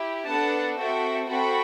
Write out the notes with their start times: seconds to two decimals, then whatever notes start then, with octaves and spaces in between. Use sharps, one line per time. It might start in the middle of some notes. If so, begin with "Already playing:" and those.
Already playing: E4 G4
0.27 B3 D4 A4 F#5 A5
0.77 C4 F#4 A4 E5 G5
1.29 C4 F#4 A4 G5 B5